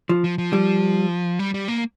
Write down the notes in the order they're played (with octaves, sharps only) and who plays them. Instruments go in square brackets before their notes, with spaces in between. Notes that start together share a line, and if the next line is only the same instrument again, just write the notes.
[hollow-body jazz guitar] F3
[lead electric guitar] F3
F3
[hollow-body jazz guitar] G3
[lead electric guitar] G3
G3
A#3